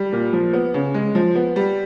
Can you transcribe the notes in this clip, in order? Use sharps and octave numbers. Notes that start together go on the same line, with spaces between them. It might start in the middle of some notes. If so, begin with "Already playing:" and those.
Already playing: G3
A#2
F3
B3
C#3
G#3
F3
B3
G3